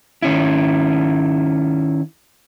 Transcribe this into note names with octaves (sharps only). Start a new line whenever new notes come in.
D#3 C#4 E4